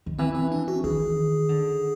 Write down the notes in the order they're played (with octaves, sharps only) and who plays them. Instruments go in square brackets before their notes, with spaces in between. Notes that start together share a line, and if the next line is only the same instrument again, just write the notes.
[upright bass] D#3
[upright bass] E3 [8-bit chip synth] C4
[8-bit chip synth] C4
D4
F#4
[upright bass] D#3 [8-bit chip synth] G#4
[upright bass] D3